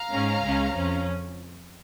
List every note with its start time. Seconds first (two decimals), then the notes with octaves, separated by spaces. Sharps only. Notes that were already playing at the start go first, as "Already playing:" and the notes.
Already playing: F5 A#5
0.11 G#2 G#3 C#4
0.43 C#2 C#3 G#3 C#4
0.75 F2 F3 C#4